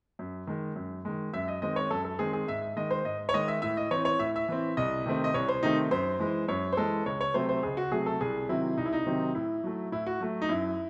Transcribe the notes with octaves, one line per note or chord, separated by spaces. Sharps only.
F#2
D#3 G#3
F#2
D#3 G#3
F#2 E5
D#5
D#3 G#3 C4 D#5
C#5
F#2 A4
A4
D#3 G#3 C4 G#4
G#4
G#2 E5
E5
D#3 G#3 D#5
C5
G#2 D#5
C#5
D#3 G#3 D#5
E5
A2 E5
D#5
E3 C4 C#5
C#5
A2 E5
E5
E3 C4
C2 D#5
C3 D#3 A3 C4
D#5
C2 C#5
C5
C3 D#3 A3 C4 D#4
F#2 C5
E3 G#3
F#2 C#5
C5
E3 G#3 A4
C#2 C#5
C#5
C3 F#3 A3 C5
C5
C#2 G#4
F#4
C3 F#3 A3 G#4
A4
C2 G#4
C3 D#3 F#3 C4 E4
C2 D#4
E4
D#4
C3 D#3 F#3 C4
A2 E4
F#3 A3
A2 E4
F#4
F#3 A3
D#4
F#2 E4